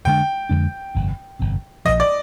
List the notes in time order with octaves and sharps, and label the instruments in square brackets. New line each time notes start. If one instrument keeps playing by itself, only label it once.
[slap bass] F2 D3 G#3 D4 [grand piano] G5
[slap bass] F2 D3 G#3 D4
G1 F2 C3
G1 F2 C3
[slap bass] A#1 A#2 F3 [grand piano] D#5
[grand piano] D5